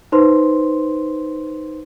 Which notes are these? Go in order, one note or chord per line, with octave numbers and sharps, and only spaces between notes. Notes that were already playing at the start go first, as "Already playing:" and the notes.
D#4 B4 C5 C6